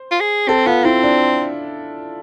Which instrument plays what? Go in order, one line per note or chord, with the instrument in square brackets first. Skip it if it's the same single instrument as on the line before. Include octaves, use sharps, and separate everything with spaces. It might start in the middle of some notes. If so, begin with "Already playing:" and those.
Already playing: [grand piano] C5
[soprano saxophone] F4
G#4
[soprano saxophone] C4 [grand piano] A4
[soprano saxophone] B3 [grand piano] F4
[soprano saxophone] C4 [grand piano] E4
[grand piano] D4